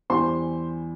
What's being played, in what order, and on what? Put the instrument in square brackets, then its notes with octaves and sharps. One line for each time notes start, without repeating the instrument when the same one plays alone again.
[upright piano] E2 E3 G3 C5 C6